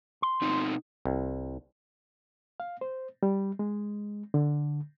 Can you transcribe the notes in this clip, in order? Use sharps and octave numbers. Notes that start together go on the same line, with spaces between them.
C6
B2 C4 D#4
C2
F5
C5
G3
G#3
D3